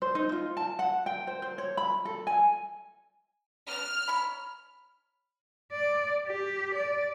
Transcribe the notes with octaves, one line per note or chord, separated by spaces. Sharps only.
C5
D#4
F4
A5
F#5
G5
C5
C5
C#5
B5
A4
G#5
B3 F6
C#5 A#5 B5
D5
G4
D5